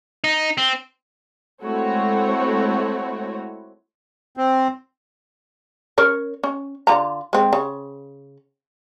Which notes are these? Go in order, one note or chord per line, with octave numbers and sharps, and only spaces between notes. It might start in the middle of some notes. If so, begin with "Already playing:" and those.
D#4
C4
G#3 A3 C4 E4 F#4 C#5
C4
C#4 A#4 C#5
C#4
D3 F4 A#5
G#3 C4
C#3